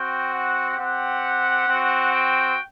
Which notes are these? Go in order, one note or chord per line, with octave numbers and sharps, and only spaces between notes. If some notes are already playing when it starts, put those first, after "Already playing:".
Already playing: C4 F#4 G5
F#5
C4 G4 F#5
C4 F#4
G5